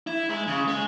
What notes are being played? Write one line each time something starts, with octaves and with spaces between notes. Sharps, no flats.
E4
G#3
C#3
G#3